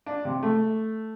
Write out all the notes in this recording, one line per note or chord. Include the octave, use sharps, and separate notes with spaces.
D4
C3
A3